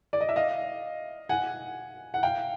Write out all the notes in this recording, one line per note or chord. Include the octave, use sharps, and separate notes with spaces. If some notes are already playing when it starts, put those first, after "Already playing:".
D5
D#5
E5
D#5 F5
F#5 G#5
F#5
F5 G5